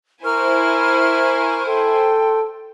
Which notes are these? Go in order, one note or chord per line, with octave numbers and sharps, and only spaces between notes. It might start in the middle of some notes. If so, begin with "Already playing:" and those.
E4 A#4 C5 G#5 C#6 F6
A4 G5 C6